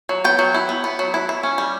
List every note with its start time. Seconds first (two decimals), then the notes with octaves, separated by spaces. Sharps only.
0.09 F#3
0.24 B3 G5
0.39 F#3
0.54 E4
0.69 B3
0.84 B3
0.99 F#3
1.14 E4
1.29 E4
1.43 C#4
1.58 G3